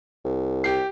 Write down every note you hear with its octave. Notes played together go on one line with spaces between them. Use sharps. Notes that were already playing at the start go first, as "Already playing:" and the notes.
C2
G4 C7